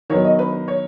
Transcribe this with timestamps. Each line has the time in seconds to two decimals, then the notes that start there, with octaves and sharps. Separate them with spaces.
0.10 D#3 F#3 B3 C#5
0.25 D#5
0.39 B4
0.53 B4
0.68 C#5